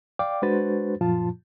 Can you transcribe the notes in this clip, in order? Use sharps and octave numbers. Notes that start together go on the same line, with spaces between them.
D5 F5 G5 D6
G#3 D4 F#4 B4 C5 A6
F#2 A#2 F3 F4 A5